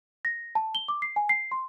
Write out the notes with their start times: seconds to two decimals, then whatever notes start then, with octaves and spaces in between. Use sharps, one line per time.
0.25 A#6
0.55 A5
0.75 G7
0.88 D6
1.02 C7
1.16 G#5
1.29 C7
1.52 C6